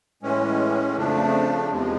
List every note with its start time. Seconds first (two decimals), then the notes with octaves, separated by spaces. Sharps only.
0.22 A2 E3 G#3 C#4
0.97 F2 C#3 F3 A3 D4
1.71 E2 C3 F3 G#3